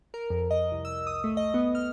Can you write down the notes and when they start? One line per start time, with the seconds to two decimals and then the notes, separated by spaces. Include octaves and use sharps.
0.14 A#4
0.30 F2
0.51 D#5
0.72 C2
0.85 E6
1.07 D#6
1.24 A3
1.37 D#5
1.54 B3
1.75 F6